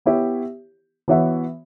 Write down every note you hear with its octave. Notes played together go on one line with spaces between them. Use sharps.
B3 E4 G4 C#5 E5
E3 B3 F#4 C#5 E5